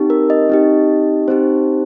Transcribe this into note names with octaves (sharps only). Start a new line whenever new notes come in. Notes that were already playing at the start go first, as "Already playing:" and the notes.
Already playing: C4 D#4 G4
A#4
D#5
C4 D#4 G4
C4 D#4 G4 C5